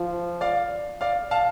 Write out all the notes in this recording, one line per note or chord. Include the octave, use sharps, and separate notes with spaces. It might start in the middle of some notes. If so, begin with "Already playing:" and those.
Already playing: F3
D5 F5
D5 F5
F5 A5